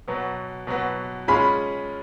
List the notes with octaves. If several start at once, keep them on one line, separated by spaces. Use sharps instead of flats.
B2 F#3 B3
B2 F#3 B3
G#3 C#4 F4 G#4 G#5 B5